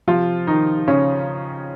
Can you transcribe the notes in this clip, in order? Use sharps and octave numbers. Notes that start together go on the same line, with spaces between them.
C3 F3 F4
D#3 D#4
C#3 C#4